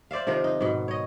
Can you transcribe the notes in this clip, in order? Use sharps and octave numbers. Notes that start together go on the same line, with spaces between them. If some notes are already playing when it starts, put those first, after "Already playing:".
C5 D5 E5 F5
C3 D#3 F3 A#4
D#4
G#2 B2
C#5 D#5